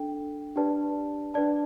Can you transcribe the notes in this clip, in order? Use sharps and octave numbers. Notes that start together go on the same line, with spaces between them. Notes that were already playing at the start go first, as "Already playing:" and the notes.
Already playing: D4 A4 G5
D4 G4 B4 D5 A5
D4 B4 D5 A5